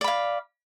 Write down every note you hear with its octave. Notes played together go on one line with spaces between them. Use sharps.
D5 F5 B5